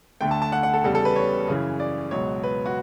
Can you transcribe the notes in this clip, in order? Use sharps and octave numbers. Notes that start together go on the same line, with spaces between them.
D2 D3 A3 G5
A5
A5
F#5
F#5
A4
E2 C#3 G3 A4
A4
B4
C#5
F#2 C#3 E3
D5
C#2 B2 F#3 C#5
B4
F#4